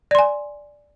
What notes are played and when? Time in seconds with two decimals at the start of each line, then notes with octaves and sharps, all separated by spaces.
0.11 D5
0.15 C6
0.19 G#5